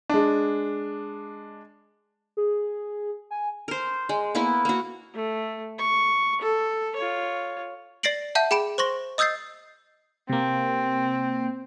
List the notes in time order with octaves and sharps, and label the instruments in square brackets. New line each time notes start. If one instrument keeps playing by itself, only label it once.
[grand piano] G#3 D4
[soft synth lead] G#4
G#5
[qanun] A#4 C5
G#3
A#3 B3 E4
A#3 F#4
[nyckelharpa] A3
C#6
A4
F4 C#5
[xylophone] D5 A6 A#6 C7 D7 F#7
E5 F#5 A5 G6
G#4 G5 B5 D7 E7
C5 C6 C#6 A#6
D#5 D#6 E6 G6 A6 C7
[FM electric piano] C3 A#3 [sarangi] C4